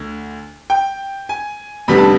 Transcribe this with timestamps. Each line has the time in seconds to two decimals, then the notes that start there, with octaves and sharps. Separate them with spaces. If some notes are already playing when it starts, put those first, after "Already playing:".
Already playing: D2 D3
0.70 G5
1.29 G#5
1.88 F1 F2 D3 G3 B3 B5
1.98 A5